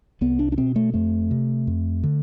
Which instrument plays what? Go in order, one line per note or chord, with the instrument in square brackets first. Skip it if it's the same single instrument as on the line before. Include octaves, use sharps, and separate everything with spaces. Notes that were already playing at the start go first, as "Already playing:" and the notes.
[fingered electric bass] C2 B3
D4
D4
B2 C4
A3
F2 A3
C3
F2
D3